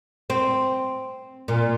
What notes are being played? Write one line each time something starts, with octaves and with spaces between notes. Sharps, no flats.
C4
A#2